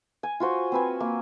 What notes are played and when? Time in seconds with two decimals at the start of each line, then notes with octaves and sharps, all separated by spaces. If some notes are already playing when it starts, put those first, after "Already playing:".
0.23 G#5
0.40 F4 F#4 C5
0.72 C4 B4 G#5
1.00 A#3